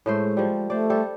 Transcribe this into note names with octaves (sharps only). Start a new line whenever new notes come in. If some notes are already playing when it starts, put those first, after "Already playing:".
A2 G#3 A3 C5
F3 G3
A3 C5 D5
G3 G4 A4